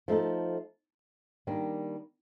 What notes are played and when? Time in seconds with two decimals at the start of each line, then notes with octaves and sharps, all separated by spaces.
0.08 F3 A3 D#4 A4
1.47 D#3 G3 A#3 D4